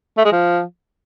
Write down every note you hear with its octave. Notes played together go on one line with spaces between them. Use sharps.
A3
G#3
F3